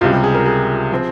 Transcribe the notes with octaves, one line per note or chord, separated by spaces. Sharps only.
C#2 C3 G3 F4
G4
G#4
A#4
G#4
F3 C4